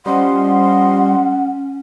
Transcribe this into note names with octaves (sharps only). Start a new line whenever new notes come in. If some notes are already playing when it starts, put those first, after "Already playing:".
F3 G3 C#4 D#5 F#5 C6